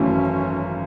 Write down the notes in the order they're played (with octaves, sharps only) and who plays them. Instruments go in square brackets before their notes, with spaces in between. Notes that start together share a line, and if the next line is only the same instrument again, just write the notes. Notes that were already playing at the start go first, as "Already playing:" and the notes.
Already playing: [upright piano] G#1 F#2 E3 A3 E4 [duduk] C#4